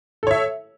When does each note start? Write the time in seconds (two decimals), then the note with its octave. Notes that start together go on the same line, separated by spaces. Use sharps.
0.23 A4
0.27 C#5
0.31 E5